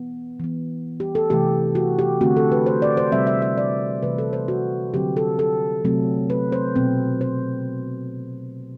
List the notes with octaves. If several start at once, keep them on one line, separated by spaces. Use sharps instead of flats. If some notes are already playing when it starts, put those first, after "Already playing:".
Already playing: E3 B3
E3 B3
G4
A4
C3 E3 A3 G4
F#4
G4
D3 A3 C4 F#4
A4
B4
C5
D5
C5
C3 G3 C4 E5
E5
E5
D5
C3 E3 A3 B4
A4
C5
F#4
D3 F#3 C4 G4
A4
A4
C3 F#3 A3 C4
B4
C5
B2 F#3 C4
C5